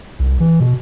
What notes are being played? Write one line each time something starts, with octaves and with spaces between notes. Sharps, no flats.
C2
E3
B2